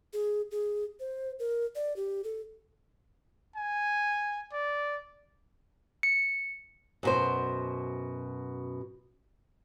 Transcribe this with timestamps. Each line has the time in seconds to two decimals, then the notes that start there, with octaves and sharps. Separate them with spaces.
0.13 G#4
0.51 G#4
1.00 C5
1.39 A#4
1.76 D5
1.96 G4
2.24 A4
3.56 G#5
4.52 D5
6.03 C#7
7.03 F#2 B2 C5